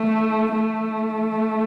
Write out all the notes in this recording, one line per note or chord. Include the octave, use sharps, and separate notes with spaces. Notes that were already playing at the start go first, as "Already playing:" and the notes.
Already playing: A3
A3